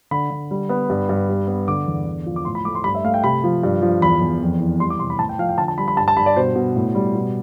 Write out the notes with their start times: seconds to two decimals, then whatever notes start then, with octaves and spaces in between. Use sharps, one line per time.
0.11 D3 B5
0.30 D3
0.51 G3
0.69 B3
0.90 G2
1.09 G2
1.29 G3
1.47 B3
1.68 D3 D6
1.86 E2
2.06 D3
2.26 F3
2.36 D6
2.45 A2 C6
2.55 B5
2.65 A3 D6
2.75 C6
2.84 G2 B5
2.95 E5
3.04 A3 F5
3.14 G5
3.24 C3 B5
3.44 F3
3.63 G2
3.82 F3
4.02 E2 B5
4.21 E2
4.41 F2
4.61 E3
4.80 G3 C6
4.90 D6
4.99 C3 C6
5.10 B5
5.19 A2 A5
5.29 G5
5.39 F3 F5
5.49 G5
5.58 D3 A5
5.68 A5
5.78 G3 B5
5.88 B5
5.97 G2 A5
6.08 A5
6.17 G2 B5
6.26 D5
6.36 B2 C5
6.56 B2
6.76 A2
6.95 G3
7.15 B2